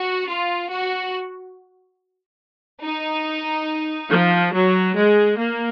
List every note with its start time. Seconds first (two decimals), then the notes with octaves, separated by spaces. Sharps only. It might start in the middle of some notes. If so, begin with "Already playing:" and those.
Already playing: F#4
0.28 F4
0.70 F#4
2.82 D#4
4.10 F3
4.53 F#3
4.94 G#3
5.37 A#3